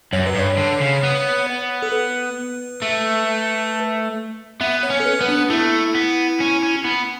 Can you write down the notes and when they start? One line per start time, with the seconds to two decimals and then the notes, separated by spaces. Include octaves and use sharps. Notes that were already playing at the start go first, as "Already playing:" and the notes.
0.13 F#2 C#5
0.26 B4
0.35 G2 C#5
0.57 D3
0.81 C#3
1.03 B3
1.82 A4
1.92 B4
2.82 A3
4.61 B3 E5
4.83 C#5
4.90 C#4
5.00 A4
5.06 B4
5.21 B3
5.29 D4
5.50 A3 E4
5.95 B3
6.40 C#4
6.63 C#4
6.84 B3